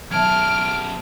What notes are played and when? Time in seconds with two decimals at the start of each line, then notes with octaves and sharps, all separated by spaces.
0.11 F#2 B2 E5 A5 F6 G#6 D7